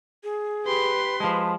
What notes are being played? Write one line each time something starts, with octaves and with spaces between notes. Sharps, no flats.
G#4
G4 B4 C6
F3 G#3 A5